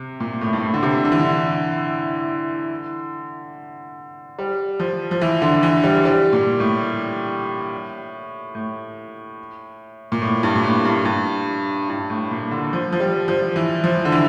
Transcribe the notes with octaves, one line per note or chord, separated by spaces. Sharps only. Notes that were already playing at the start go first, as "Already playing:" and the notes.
Already playing: C3
A#2
A2
G2
A2
D3
C3
D3
E3
D3
G3
F3
F3
E3
D3
E3
G3
G3
A#2
A2
A2
A#2
A2
G2
A#2
A2
G2
G2
G2
A2
A#2
D3
F3
F3
G3
F3
E3
F3
D3
E3